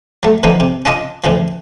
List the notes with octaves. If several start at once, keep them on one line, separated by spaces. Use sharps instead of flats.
F#3 A3
D3 E3 F3 A#3 D#4
C3
C#4 D4 F4 D#5 G#5
D2 C#3 E3 F3